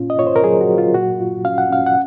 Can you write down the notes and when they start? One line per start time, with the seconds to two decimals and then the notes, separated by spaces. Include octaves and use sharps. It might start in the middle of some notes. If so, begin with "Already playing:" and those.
Already playing: A#2 C#4 F4
0.10 D#5
0.19 F4 C#5
0.27 C5
0.36 A#4
0.44 F#3 G#4
0.61 F#4
0.69 F#3
0.78 F4
0.94 A#2 F#4
1.20 F4
1.45 C#4 F5
1.58 F#5
1.70 C#4 F5
1.86 F#5